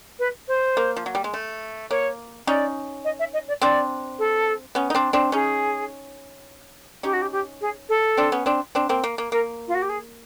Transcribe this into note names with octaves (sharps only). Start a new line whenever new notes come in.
B4
C5
A#3
F3
F#3
G3
G#3
A3
A#3 C#5
C#4 D#4 D5
D#5
E5
D#5
D5
C4 D4 D5
A4
B3 C#4
D#4
C4 D4
C4 D4
C#4 D#4 G#4
C#4 D#4 G4
F#4
G4
G4
G#4
A4
C4 D4
B3 C#4
C4 D4
C4 D4
A#3 C4
A#3
A#3
A#3 A#4
F4
F#4
G4
G#4